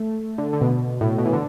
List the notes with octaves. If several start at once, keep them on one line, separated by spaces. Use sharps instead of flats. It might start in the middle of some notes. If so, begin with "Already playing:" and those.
Already playing: A3
D3
D3
B2
A2
B2
E3
D3